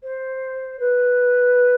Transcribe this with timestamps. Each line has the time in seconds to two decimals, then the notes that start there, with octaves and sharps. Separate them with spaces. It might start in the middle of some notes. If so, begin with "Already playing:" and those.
0.03 C5
0.79 B4